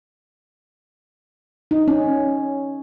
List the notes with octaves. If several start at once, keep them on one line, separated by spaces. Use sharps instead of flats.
D#4
C#4